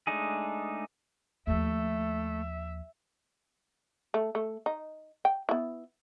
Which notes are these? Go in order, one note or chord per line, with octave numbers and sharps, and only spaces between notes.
G#3 A3 D4 D#4 G#4
D#2 F3 A3 E5
A3
A3
D#4
G5
B3 E4